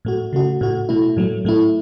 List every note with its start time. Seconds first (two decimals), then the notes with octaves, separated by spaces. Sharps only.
0.05 A2 A3 F#4
0.33 C#3 A3 F#4
0.61 A2 A3 F#4
0.89 B2 A3 E4
1.17 A2 F#3 A3
1.45 A2 A3 E4